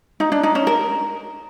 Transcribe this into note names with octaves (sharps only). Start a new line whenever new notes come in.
D#4
D4
D#4
C#4
A#4